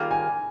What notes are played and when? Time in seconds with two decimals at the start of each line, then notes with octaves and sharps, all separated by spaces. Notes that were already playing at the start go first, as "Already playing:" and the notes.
Already playing: D#3 G3 A#3 F4 G#4
0.11 G#5